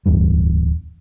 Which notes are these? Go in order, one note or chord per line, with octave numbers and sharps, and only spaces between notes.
D1 E2 G2 G3